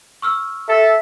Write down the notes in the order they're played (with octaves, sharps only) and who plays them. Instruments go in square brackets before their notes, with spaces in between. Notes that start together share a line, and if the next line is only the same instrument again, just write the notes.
[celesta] C#6 E6 F6
[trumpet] A4 [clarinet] E5